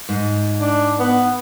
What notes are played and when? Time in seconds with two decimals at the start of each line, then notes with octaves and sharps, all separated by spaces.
0.09 G#2
0.61 D4
1.00 B3